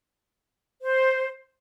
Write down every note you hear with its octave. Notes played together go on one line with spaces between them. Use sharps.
C5